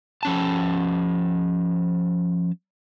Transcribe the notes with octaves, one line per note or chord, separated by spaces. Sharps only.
F3 C#4 A5